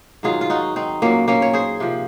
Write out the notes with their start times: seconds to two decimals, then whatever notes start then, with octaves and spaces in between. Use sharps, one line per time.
0.23 G#2 D#3 F#3 F4 G#4
0.41 F4
0.50 D#4 F#4
0.76 C4 D#4
1.02 A#2 F#3 A#3 C#4
1.28 A#3 C#4
1.42 C#5
1.53 G#4 C5
1.80 C3 F3